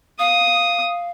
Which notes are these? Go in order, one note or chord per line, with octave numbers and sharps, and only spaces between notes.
F5 D#6